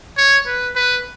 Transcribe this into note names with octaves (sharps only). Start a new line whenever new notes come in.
C#5
B4
B4